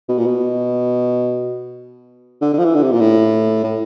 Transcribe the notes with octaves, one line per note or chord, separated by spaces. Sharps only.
B2
A#2
B2
D3
D3
F3
E3
D3
C3
A#2
A2
A2